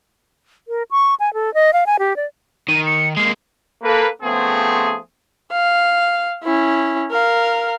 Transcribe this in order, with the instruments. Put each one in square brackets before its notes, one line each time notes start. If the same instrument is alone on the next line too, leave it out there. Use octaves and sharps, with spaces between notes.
[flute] A#4
C#6
G#5
A4
D#5
F5
G#5
G4
D5
[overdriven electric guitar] D#3 [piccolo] D#7
[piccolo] C#7
[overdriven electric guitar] G#3 A#3 [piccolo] C7
[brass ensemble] A#3 A4 B4
C#3 F3 A3 B3 C4 G#4
[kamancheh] F5
C#4 E4
A#4 F5